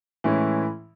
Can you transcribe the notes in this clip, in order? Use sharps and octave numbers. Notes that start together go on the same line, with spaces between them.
A2 E3 G#3 C#4 E4